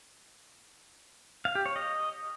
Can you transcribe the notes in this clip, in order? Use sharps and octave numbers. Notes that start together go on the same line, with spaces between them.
F5
G4
C#5
D#5